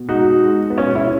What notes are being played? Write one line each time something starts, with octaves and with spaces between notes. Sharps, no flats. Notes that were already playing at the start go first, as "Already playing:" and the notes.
Already playing: B2
G#3 D#4 F#4
G#3
B3
B2 C#4
C#4 E4